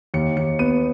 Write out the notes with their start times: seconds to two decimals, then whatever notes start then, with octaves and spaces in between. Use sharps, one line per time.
0.14 D#2 C#7
0.37 D#2 C#7
0.59 B3 D#7